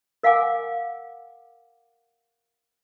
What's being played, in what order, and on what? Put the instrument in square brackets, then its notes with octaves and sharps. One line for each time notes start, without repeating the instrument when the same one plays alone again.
[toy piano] A#4 F5 F#5 G#5 D6